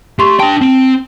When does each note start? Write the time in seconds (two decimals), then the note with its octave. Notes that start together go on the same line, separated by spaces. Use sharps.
0.19 A3 G4 C6 C#6
0.39 D4 G5 A5
0.61 C4